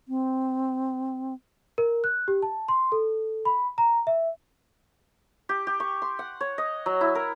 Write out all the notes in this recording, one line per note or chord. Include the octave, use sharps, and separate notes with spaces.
C4
A#4
F#6
G4
A5
C6
A4
B5
A#5
E5
G4
G4
C#6
C6
F#5
C#5
D#5
F#3
E4
A#4